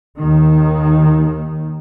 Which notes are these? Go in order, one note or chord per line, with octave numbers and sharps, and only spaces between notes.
D#2 D#3